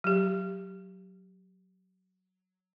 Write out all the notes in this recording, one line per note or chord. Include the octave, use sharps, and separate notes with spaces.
F#3 G4